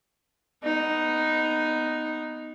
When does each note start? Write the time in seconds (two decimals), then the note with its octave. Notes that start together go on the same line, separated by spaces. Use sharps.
0.63 B3 D#4